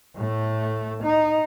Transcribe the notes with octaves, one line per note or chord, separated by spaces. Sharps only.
A2 A3
D#4